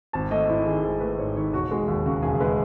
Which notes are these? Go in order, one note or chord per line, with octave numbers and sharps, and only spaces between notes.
G#1 A5
A3 D#5
G#2 E4
D#3 G#4
G#1 G#4
A3 B4
G#2 C#5
D#3 C#5
E1 F#4
G#3 F#4
D#2 F#4
C#3 F#4
E1 G#4
G#3 B4